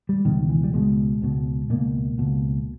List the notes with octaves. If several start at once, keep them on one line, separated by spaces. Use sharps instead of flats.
G3
C#2 B2 D#3
E3
G3
C#2 B2 G#3
C#2 B2
C#2 B2 A#3
C#2 B2